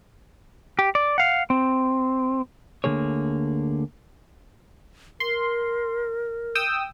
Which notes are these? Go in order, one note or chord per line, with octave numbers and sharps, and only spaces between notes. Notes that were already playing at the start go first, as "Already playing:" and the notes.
G4
D5
F5 F#5
C4
D2 A#2 D3 A#3 G#4 C#5
A#4 C6
G5 D#6 E6